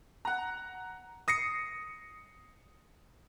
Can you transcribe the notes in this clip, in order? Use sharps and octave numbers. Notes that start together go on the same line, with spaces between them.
F#5 A#5
D#6 A#6 C7 C#7